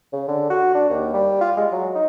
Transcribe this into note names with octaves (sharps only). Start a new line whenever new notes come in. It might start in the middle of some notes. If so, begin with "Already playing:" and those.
C#3
D3
F#4
D4
D#2
G3
F4
G#3
F#3
D#4